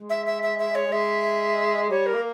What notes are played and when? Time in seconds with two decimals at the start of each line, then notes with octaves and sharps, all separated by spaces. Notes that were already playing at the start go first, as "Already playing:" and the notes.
Already playing: G#3
0.10 E5
0.26 E5
0.43 E5
0.59 E5
0.75 C#5
0.91 G#3 E5
1.90 G3 C#5
2.06 A#4
2.14 A#3